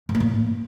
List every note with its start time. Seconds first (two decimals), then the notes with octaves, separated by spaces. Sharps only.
0.09 G#2
0.15 A#3
0.20 A2